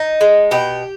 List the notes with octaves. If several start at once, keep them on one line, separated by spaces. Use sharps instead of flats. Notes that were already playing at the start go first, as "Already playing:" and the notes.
Already playing: D#4
G#3
B2 G4